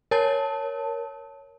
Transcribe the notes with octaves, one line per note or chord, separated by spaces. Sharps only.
A#4 C#5 A5